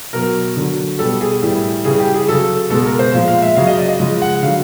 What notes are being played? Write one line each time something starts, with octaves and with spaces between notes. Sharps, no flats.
B2 F#3 A#4
D3 F#3
B2 G3 A4
G#4
A2 E3 G3
C#3 E3 G3 G#4
G4
G#4
C#3 F#3 A4
B2 G#3 A4
A#4
C5
A#2 F3 G#3 F5
F5
E5
C#3 F#3 F5
D#5
D5
D#5
C#3 F3 G#3
F#5
D3 F#3 F5